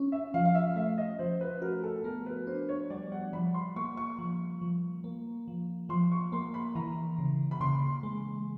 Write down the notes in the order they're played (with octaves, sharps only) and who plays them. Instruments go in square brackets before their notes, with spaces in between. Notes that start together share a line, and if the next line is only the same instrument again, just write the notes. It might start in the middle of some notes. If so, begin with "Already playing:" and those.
Already playing: [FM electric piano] C#4
[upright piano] E5
[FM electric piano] F3 [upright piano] F5
[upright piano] F5
E5
[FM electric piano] A3 [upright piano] E5
[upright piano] D#5
[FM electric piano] F3 [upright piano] C5
[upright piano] B4
[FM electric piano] F#4 [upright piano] A#4
[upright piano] A4
A4
[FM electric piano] B3 [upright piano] A#4
[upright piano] B4
[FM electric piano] D4 [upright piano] C5
[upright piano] C#5
[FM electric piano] G3 [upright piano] D5
[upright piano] F#5
[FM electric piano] F3 [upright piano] B5
[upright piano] C6
[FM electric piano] A#3 [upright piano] C#6
[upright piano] C#6
[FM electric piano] F3
F3
A#3
F3
[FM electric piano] F3 [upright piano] C6
[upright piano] C#6
[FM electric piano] A#3 [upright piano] C6
[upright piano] B5
[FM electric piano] E3 [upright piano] A#5
[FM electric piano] C#3
[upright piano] B5
[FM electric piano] C#3 [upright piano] C6
[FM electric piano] G#3